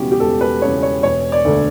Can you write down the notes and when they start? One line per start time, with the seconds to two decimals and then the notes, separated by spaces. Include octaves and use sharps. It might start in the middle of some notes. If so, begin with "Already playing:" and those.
Already playing: E1 E2 C#3 G3 B3 F#4 G4
0.12 G4
0.20 E1 A4
0.41 B4
0.62 E2 C#3 G3 B3 C#5
0.83 C#5
1.03 E1 C#5
1.32 D5
1.45 D2 D3 A3